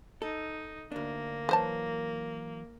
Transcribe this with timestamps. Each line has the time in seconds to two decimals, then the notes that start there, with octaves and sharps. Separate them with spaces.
0.22 D#4 A4
0.92 D2 A#3 D4
1.49 E3 F#3 B4 C5 A5